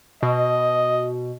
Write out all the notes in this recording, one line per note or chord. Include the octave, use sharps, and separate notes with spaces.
B2 D#5